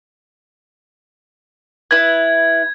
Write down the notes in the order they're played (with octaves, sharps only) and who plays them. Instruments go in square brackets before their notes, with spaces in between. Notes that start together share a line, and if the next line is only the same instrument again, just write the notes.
[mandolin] E4 B4 [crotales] G#6